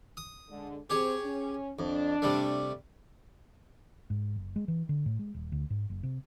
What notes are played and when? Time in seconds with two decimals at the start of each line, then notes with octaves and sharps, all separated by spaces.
0.17 D#6
0.49 D3 G#3
0.90 C4 G4 G#4 C#5
1.24 C#4
1.79 F2 D4
2.22 C3 G3 A3
4.10 G#2
4.36 F#1
4.56 G#3
4.68 E3
4.89 D3
5.06 A2
5.19 G#3
5.34 D#1
5.52 D2
5.70 G#2
5.90 F#1
6.03 C3